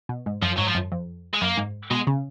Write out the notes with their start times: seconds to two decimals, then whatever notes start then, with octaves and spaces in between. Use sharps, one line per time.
0.09 B2
0.26 G#2
0.42 F#2 F3
0.57 G#2 F#3
0.67 F3
0.75 F#2
0.92 F2
1.34 G#3
1.41 F#2 A#3
1.57 G#2
1.91 B2 G#3
2.07 C#3